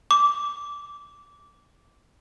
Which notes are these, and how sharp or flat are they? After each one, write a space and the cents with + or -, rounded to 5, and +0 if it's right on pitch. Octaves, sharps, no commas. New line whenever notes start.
D6 -15